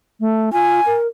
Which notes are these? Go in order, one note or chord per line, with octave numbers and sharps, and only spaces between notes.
A3
F4 G#5
A#4